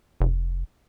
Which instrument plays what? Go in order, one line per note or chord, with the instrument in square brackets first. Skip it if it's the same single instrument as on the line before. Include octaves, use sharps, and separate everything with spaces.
[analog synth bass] F1